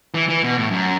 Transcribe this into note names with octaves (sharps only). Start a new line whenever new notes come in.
E3
E3
B2
A2
F#2